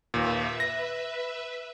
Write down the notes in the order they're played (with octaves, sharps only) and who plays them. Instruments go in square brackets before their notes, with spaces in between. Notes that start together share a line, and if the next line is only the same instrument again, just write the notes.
[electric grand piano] D#2 A#2 [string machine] B4 E5
[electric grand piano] A#6